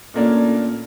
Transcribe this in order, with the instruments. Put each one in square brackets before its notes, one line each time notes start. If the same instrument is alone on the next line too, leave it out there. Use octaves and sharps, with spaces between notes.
[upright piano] A#2 A3 A#3 C#4 D4